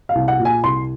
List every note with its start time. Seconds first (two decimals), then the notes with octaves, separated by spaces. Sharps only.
0.09 F5
0.15 C2
0.28 F#5
0.39 A#2
0.45 G#5
0.64 C2 C6